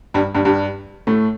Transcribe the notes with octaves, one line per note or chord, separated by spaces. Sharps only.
G2 G3
G2 G3
G2 G3
A2 A3